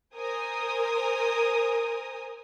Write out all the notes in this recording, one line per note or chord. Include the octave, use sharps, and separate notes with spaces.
A#4 C5 G#5 D#6